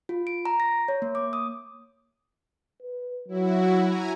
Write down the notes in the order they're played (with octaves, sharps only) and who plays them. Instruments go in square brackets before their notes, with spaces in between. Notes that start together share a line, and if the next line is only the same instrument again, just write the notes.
[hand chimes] F4
D7
A#5
A#6
C#5
A#3
D6
D#6
[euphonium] B4
[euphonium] F#3 [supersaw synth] E4 F#4
[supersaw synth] G#5 A#5